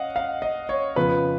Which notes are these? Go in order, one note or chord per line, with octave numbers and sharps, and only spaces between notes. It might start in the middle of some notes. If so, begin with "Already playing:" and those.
Already playing: C#4 D#5 F5 F#5
F5
D#5
C#5
F2 C#3 F3 B3 B4